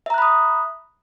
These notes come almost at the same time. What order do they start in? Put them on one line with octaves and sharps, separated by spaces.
E5 A#5 F#6 B5 D#6